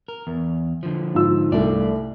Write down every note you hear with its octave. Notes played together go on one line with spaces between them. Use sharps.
A#4
E2
D3 F3
G#2 F4 E6
C2 G2 A3 D5